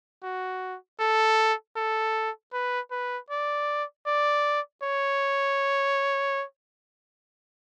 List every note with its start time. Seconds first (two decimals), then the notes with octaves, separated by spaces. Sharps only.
0.23 F#4
1.00 A4
1.77 A4
2.53 B4
2.91 B4
3.30 D5
4.07 D5
4.83 C#5